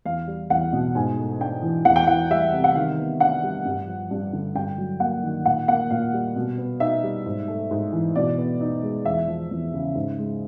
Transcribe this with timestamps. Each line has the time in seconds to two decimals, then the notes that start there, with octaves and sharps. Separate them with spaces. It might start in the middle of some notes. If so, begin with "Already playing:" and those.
0.05 E2 F5
0.28 G3
0.50 E2 F#5
0.73 B2
0.95 G#2 G#5
1.18 A3
1.40 D4 G5
1.62 E3
1.85 E2 F#5
1.96 G5
2.07 E3 F#5
2.30 G3 E5
2.53 C3
2.64 F#5
2.75 D#3 F5
2.98 B3
3.20 D4 F#5
3.43 G3
3.65 G2
3.88 F3
4.11 G2
4.33 D3
4.55 G2 G5
4.78 F#3
5.00 A#3 F#5
5.23 D#3
5.45 A#2 F#5
5.68 A#3 F#5
5.90 A#2 F5
6.13 G3
6.36 B2
6.58 B3
6.80 D#4 E5
7.04 G3
7.26 G#2
7.48 A3
7.71 G#2
7.93 E3
8.16 B2 D5
8.38 B3
8.61 D#4
8.83 G#3
9.05 E2 E5
9.28 F3
9.51 E2
9.74 C#3
9.95 G#2
10.19 G#3